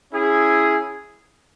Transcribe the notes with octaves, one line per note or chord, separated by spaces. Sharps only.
C#4 E4 G#4